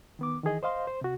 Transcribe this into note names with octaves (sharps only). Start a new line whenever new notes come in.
D#3 B3 D6
D#3 E3 G#4 D#5
C5 D#5 F5 C6
C5
C3 F#4